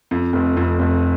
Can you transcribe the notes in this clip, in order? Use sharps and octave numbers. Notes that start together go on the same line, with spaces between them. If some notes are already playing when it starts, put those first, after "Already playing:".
F2
F1
F2
F1